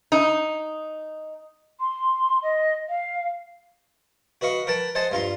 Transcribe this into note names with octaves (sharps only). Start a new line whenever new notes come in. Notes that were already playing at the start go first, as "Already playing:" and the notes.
D#4
C6
D#5
F5
F#4 B4 D#5 F5 C#6
A#4 B4 G5 A5
C5 D#5 F#5 G#5 A5
G2 F4 A#5 C6